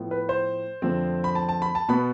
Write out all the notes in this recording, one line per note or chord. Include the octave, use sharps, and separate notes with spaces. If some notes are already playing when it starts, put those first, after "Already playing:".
Already playing: A2 F3 B3
B4
C5
F2 D3 F3 A3 C4
B5
A5
A5
B5
A5
B2 B3 B5